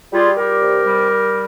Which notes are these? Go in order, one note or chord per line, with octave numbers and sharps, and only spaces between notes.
G3 F4 G#4
G3 G4 A#4
C3
G3
G3